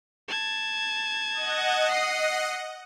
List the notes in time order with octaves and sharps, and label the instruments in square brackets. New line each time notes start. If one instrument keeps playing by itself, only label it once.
[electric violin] A5 G#6
[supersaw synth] D#5 F#5
[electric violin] D#6 C7